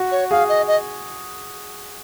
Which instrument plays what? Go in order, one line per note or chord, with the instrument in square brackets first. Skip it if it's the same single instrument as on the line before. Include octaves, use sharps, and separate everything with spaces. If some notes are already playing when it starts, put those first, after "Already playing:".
Already playing: [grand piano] F#4
[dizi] C#5
[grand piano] G#4 [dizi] F5
[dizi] D#5
D#5